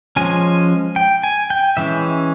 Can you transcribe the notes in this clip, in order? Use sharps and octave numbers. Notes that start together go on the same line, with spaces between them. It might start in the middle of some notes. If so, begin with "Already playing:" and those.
F3 G#3 C#4 G#5
G5
G#5
G5
E3 G#3 C#4 E5